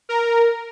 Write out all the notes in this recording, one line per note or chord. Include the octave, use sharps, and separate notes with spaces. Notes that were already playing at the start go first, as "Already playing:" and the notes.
A#4